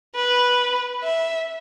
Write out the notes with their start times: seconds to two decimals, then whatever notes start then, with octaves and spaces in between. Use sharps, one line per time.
0.15 B4
1.04 E5